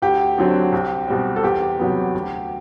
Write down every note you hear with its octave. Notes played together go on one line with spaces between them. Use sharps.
D2 G4
D3 F#3 C4
C2
B2 G3 C4
A4
E2 G4
C3 F#3 B3
D2